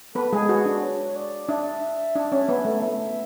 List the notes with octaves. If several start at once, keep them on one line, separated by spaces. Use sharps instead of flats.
B3 A4 B4
G#3 G#4
F#4 B4
D4
C#5
D5
D4 E5
D4
C#4
B3
A3
B3 E5